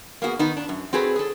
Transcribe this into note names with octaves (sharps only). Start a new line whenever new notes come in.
A#3 B3 F#4 G#4
D#3 B3 D#4
D4
F#2
C4 F#4 G#4 A4 B4 C#5
G#4 A4